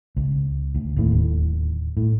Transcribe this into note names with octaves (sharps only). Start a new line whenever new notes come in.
C#2
D2
D1 D#2 A2
A2